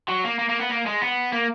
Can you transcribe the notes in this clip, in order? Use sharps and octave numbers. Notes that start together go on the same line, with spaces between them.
F#3
A#3
A#3
A#3
B3
A#3
G#3
B3
A#3